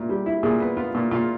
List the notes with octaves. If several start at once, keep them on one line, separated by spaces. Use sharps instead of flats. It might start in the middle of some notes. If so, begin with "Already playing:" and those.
Already playing: A#2 E4
G3
E4
A#2 G#4
B3
B3 F4
A#2
A#2 F4